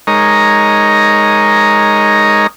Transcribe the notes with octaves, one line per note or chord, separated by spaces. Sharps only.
G#3 D#4 A#4 C#5 D#5 A#5